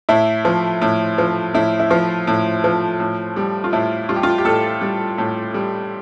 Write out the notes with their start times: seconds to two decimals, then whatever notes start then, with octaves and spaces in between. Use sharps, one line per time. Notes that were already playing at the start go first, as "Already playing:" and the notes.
0.09 A2 E4
0.45 F3
0.82 A2
1.18 F3
1.54 A2 E4
1.79 E4
1.90 F3 F4
2.27 A2
2.64 F3
3.00 A2
3.36 G3
3.64 F4
3.73 A2 E4
4.09 G3 F4
4.16 G4
4.23 F4
4.38 G4
4.45 A2 A4
4.81 G3
5.18 A2
5.54 G3